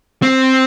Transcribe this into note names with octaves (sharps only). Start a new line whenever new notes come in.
C4